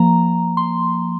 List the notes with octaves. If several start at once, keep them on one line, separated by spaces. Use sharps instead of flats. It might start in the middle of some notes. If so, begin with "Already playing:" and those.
Already playing: F3 A#3 A#5
C6